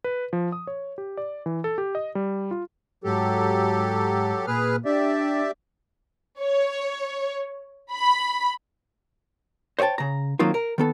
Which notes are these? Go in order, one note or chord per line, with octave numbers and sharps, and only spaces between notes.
B4
F3
D#6
C#5
G4
D5
E3
A4
G4
D#5
G3
F4
G#2 F#3 G4 A4
A#2 G#4 B4 F6
D4 G4 D5 E5
C#5
B5
C5 C#5 D#5 G5 A5
C#3 A#5
D#3 F#3 A#3 C4 D#4 F4
A#4
D#3 B3 A4